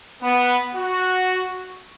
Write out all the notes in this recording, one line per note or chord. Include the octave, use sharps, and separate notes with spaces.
B3
F#4